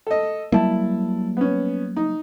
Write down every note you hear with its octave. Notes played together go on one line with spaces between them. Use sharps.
A4 D#5
F#3 G3 A#3 E4 A5
B3 C#4
D#4